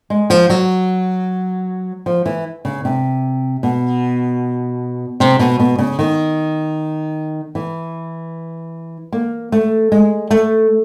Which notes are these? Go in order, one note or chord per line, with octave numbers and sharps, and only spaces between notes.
G#3
F3
F#3
F3
E3
C#3
C3
B2
C3
B2
B2
C#3
D#3
E3
A#3
A3
G#3
A3